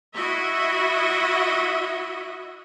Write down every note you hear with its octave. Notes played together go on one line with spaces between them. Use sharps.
E4 F#4 D#5 E5